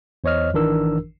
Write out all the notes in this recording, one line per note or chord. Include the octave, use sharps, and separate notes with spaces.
E2 C5 C#5 D#5 F6
G#1 D#3 E3 D4 A#4 E6